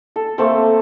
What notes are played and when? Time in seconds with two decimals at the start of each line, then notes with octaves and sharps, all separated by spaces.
0.16 A4
0.38 A3 A#3 C4 A4